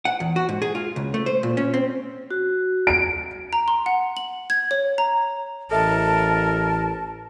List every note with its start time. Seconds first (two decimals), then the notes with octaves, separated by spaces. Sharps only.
0.05 F#5
0.20 E2
0.36 F#4
0.49 G#2
0.62 G#4
0.75 F4
0.96 C#2
1.14 A3
1.26 C5
1.43 A#2
1.57 C#4
1.74 C4
2.31 F#4
2.87 D7
3.53 A#5
3.68 C6
3.86 F#5
4.17 F#7
4.50 G#6
4.71 C#5
4.98 A#5
5.71 A1 A4 A#4 D#5 E5 A5